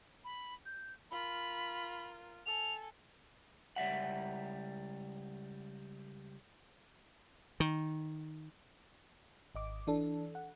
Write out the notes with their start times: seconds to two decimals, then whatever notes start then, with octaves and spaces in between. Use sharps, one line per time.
0.24 B5
0.66 G6
1.11 F4 A#4 B5
2.46 A4 G#5 F7
3.76 C#2 G3 E5 F#5
7.60 D#3
9.55 G#1 D#5 D6
9.87 E3 D4 A4
10.35 F#5